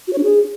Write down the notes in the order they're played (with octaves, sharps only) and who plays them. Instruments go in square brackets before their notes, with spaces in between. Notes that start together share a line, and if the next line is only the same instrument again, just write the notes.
[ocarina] F#4
C#5
D4
G#4